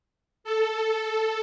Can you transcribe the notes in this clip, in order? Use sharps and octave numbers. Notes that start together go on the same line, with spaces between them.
A4